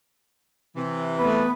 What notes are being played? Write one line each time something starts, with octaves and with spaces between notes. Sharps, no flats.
C3 E3
A3 B3 B4